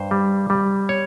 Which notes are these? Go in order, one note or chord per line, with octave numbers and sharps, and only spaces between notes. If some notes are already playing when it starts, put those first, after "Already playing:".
Already playing: G2 C5
G3
G3
C#5